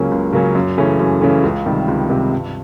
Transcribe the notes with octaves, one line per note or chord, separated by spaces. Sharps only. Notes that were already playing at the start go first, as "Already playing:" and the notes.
Already playing: C#2 C#3 F#3 A#3 C#4
C#2
C#3 F#3 A#3 C#4
F#2
C#3 E3 A3 C#4
F#2
C#3 E3 A3 C#4
C#2
C3 D#3 G3
C#2
C3 D#3 G3
G2